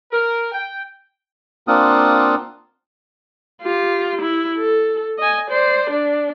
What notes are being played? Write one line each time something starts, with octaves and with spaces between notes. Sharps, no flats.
A#4
G5
A#3 C4 D4 F4 F#5 D#6
F4 G4
E4
A4
D#5 G#5
C5 D5
D4